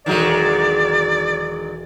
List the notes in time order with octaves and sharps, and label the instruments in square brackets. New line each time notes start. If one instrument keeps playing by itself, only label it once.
[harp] E1 F#4 E7 [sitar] D#3 F#3 G#3 [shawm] D5